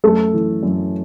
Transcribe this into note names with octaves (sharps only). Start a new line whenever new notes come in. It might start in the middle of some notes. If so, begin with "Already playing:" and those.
F#2 A3 A4
E3
F#2